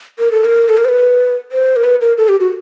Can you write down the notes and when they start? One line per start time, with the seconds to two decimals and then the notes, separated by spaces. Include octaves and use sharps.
0.19 A#4
0.32 A4
0.45 A#4
0.69 A4
0.77 A#4
0.85 C5
0.89 B4
1.52 C5
1.76 A#4
1.84 B4
2.01 A#4
2.18 A4
2.29 G4
2.40 F#4